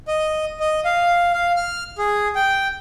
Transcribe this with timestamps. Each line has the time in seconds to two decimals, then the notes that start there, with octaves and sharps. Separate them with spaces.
0.08 D#5
0.60 D#5
0.85 F5
1.33 F5
1.56 F6
1.98 G#4
2.35 G5